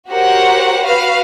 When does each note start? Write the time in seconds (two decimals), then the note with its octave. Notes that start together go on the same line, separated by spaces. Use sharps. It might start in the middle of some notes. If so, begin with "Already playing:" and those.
0.11 F#4 G4 A#4 C5 C#5 F#5
0.82 F#4 B4 F5